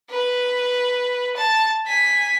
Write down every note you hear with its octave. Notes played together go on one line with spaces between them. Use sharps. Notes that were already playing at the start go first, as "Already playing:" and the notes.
B4
A5
G#5 B6